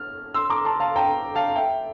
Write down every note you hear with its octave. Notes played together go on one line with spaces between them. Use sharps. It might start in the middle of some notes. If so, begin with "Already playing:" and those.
Already playing: F6
C6 E6
A#5 D6
A5 C6
F5 A5
G5 A#5
F5 A5
E5 G5